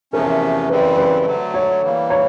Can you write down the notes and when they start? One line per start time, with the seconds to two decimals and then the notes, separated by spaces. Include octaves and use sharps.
0.13 E2 C3 F3 A3 C#4 A#4
0.69 F#2 C#3 E3 G3 C4 B4
0.97 B4
1.26 D3 F#3 A3
1.54 C#5
1.82 E3 G3 A#3
2.10 C#5